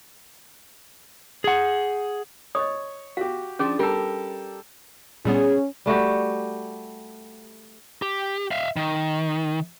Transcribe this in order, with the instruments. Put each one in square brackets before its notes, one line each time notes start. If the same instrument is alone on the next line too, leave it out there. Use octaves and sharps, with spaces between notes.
[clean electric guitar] G#4 F#5
[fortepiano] C#5 C#6 [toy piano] D#5 D#6
[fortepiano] F#4 G4 [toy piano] F5
[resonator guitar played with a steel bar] F3 D4 [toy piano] C#4 G#4
[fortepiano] G3 A4 [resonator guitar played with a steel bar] G4 A#4
[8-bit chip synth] A#2 G3 B3 [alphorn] C#4 [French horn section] G#4
[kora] G3 A3 F#4 G4
[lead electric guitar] G4
E5 F5
D#3